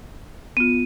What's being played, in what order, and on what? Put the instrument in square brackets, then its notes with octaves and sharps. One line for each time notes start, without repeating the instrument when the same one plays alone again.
[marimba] B3 F4 [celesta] D#7